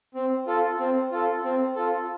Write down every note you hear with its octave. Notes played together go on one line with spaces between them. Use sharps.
C4
F4 A4
C4
F4 A4
C4
F4 A4